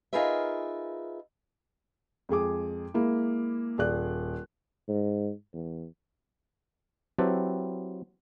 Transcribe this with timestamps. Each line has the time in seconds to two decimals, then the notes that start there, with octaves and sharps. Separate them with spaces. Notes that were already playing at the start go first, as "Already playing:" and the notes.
0.13 D#4 F4 G#4 A#4 B4 E5
2.29 F2 G#3 G#4 D6
2.94 G#3 A#3 E4
3.78 D#1 G#4 D5 F#6
4.88 G#2
5.54 E2
7.18 F#3 C4 E4 G4 B4 A5